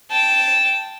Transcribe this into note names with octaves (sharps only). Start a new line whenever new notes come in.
G5 A5